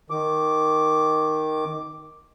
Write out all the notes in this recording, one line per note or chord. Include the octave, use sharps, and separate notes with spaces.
D#3 D6